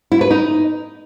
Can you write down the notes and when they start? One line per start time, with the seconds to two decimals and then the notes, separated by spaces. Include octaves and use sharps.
0.12 E4
0.21 B4
0.31 D#4